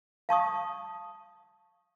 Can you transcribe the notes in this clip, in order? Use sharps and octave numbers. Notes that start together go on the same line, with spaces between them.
F5 A5 C#6 D#6